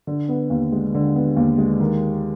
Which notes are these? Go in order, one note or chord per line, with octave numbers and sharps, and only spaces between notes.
D3
B3
D#2
G#3
D3
B3
D#2
G#3
D#3